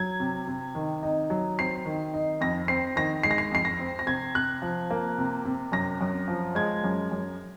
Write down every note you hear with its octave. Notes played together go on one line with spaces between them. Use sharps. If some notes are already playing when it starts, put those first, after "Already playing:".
Already playing: F#3 G#6
C3
C3
D#3
D#4
F#3
C4 C7
D#3
D#4
F2 A#6
C4 C7
D#3 A#6
G#3 C7
A#6
C7
F2 C7
A#6
C4
A#6
C3 G#6
C3 F#6
F3
A#3
C3
C3
F#2 A#6
F#2
F3
G#3 G#6
F#2
F#2